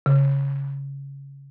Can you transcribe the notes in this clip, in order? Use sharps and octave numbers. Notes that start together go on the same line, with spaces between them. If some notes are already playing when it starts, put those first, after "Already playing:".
C#3